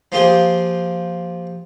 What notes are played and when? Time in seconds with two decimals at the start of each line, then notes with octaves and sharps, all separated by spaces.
0.12 F3 A#3 F4 G4 G#4 C5